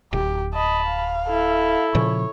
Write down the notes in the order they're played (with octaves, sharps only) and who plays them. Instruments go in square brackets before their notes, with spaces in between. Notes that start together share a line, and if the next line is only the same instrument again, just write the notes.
[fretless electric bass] D1 [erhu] G4
[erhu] D#5 [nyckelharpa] A5 B5
[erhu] F5
[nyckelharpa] E4 A4
[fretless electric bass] A#2 C#3 F3 [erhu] C#5